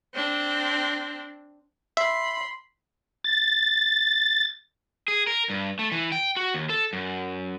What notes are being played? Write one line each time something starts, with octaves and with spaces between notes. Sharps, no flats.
C4 D4
E5 B5 C6
A6
G#4
A#4
G2
A3
E3
G5
F#4
D#2
A4
F#2